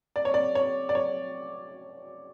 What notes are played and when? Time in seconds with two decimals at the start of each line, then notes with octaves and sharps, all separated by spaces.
0.16 D5
0.25 C#5
0.34 D5
0.55 C#5
0.89 D5
0.95 C#5